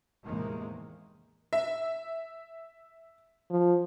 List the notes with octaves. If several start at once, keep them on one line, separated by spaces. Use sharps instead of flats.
E2 A2 C3 D#3 G#3 A#3
E5
F3